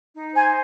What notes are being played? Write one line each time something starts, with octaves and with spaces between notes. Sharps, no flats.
D#4
C5 G#5